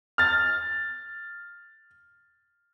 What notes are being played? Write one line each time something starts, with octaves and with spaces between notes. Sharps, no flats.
F6 A6